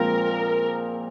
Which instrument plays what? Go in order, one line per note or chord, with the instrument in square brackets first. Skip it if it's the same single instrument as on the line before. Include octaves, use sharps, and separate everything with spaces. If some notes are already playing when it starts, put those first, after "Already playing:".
Already playing: [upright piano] A#2 F3 G#3 C4 F4 [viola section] A#4